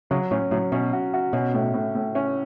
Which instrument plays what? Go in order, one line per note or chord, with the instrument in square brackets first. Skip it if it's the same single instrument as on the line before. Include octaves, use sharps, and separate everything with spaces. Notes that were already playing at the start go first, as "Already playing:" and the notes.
[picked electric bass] C#3 [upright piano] F#3
[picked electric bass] A2 [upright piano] C#4
[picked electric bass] A2 [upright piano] F#3
[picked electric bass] B2 [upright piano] C#4
[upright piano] F#4
F#4
[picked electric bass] B2 [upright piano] C#4
[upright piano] A2
A2
A2
C#4